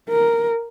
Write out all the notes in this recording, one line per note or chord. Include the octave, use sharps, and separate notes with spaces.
A#4